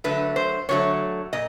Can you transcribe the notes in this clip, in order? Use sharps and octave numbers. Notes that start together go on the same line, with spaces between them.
D3 F#3 A3 B4
C5
D3 F#3 A3 C#5
A#2 D#5